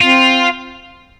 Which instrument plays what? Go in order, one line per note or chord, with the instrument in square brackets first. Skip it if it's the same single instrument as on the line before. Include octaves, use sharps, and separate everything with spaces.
[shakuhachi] C4 [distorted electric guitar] F4